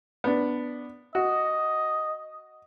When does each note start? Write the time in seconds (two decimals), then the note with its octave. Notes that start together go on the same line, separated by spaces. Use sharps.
0.24 B3 D4
1.15 F#4 D#5